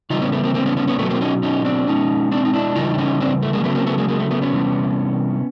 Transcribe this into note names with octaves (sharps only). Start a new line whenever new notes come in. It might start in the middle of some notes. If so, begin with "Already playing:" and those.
C#3 E3 G3 D#4 F4
B3 C#4
A3 B3
A#3 C4
A#3 C4
B3 C#4
B3 C#4
B3 C#4
B2 F#3 A3 B3
A#3 C4
C#4 D#4
C#4 D#4
C4 D4
B2 G#3 C#4 D#4
C4 D4
D#4
D4 E4
C#3 E3 G3 D#4 F4
D4
C#4 D#4
C4 D4
A3
G#3 A#3
C#3 F#3 A3 B3
A#3 C4
A3 B3
G#3 A#3
G#3 A#3
A3
A3 B3
B3 C#4
C3 E3 G3